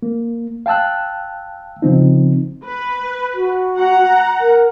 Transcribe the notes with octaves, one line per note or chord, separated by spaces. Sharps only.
A#3
F5 G5 A5 E6 F#6
C#3 F3 C4 D#4
B4
F#4
F#5 A#5
A#4